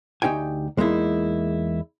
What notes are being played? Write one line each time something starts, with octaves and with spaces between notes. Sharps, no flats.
D2 D#4 G4 G5 G#5
E2 G#3 A#3 D#4 E4